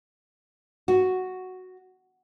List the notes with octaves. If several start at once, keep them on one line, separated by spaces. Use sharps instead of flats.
F#4